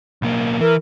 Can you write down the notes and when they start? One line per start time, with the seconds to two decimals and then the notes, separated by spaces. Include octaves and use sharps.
0.22 B1 A#3
0.61 E3 A#4